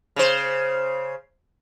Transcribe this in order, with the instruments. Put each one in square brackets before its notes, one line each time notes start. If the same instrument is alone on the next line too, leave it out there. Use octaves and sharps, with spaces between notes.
[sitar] C#3 C5